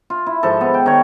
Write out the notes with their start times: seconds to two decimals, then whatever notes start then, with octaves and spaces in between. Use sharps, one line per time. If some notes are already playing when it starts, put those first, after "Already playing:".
0.10 F4
0.27 E4
0.43 G#2 F3 A4
0.61 B3
0.74 G5
0.86 D#3 C#5